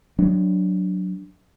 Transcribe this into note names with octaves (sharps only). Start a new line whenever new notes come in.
F#3 D4